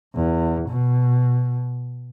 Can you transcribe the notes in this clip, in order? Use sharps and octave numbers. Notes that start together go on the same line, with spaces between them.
E2
B2